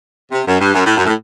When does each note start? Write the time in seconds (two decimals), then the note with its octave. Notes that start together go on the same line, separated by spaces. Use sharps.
0.31 C3
0.45 F#2
0.60 G2
0.74 F#2
0.85 A2
0.96 F#2
1.06 A2